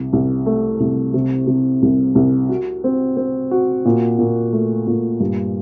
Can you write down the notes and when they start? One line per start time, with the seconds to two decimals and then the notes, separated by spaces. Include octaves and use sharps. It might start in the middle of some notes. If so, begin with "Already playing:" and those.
Already playing: C2
0.13 C2
0.46 A3
0.80 C2
1.14 C3
1.47 C3
1.82 C2
2.15 C2
2.49 F#4
2.84 C4
3.17 C4
3.51 F#4
3.85 A#2
4.19 A#2
4.53 A3
4.87 A#2
5.20 G2